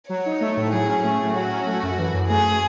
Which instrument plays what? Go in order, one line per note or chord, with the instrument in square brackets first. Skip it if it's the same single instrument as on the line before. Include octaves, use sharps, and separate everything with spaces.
[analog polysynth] F#3 [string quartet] C#5
[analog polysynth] D#4
A3
A2
[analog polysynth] F#3 [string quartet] G#4
[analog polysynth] C#4
[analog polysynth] A3 [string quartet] G#4
[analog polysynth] A2
[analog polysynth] F#3 [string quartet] F#4
[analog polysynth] C#4
A3
F#2
E3
F#2
[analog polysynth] A3 [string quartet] G#4